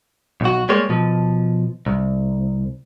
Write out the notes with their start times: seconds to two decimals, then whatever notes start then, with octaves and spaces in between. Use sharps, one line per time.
0.41 B1 F#4
0.69 G3 G#3 A#3 C#5
0.89 B2 F3
1.86 C2